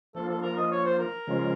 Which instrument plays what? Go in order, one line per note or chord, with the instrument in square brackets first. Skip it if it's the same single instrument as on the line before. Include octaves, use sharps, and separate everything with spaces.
[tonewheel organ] F3 A#3 D4 F4 [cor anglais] A4
[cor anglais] A4
A#4
D#5
C#5
C5
A#4
[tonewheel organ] C#3 F3 G#3 C#4 F4